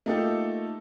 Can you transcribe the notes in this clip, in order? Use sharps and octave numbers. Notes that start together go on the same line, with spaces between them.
A3 A#3 D#4 F4 G4 A4